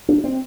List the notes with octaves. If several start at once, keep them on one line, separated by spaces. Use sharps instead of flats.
D4
C4